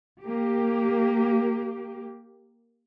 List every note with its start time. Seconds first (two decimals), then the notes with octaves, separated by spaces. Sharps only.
0.22 A#3 G4